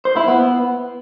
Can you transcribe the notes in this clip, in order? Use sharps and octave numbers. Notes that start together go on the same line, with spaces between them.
C5
E4
B3